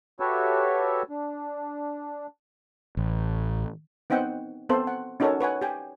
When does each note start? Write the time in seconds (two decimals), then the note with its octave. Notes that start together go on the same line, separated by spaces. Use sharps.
0.20 F#4 G4 A4 B4 C#5 E5
1.10 D4
2.97 A1
4.10 B3 C4 D#4 F#5 G5
4.69 B3 C4 A4 C5
4.87 F#5
5.20 C#4 D#4 F#4 A4 A#4 C#5
5.41 B4 C#5 F#5 G#5
5.61 G4 G5 G#5